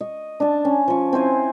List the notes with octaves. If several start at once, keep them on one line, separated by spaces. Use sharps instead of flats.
D#5 C#6
D4 A5
C#4
F3 C#6
C4 E4 C5 G#5